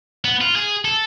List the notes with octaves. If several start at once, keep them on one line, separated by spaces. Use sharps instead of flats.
B3
F4
G#4
A4